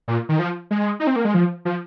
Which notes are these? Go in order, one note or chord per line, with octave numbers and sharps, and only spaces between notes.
A#2
D#3
F3
G#3
D#4
C4
A#3
G#3
F3
F3